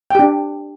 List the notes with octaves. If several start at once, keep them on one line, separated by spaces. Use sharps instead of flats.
D4 G4 G5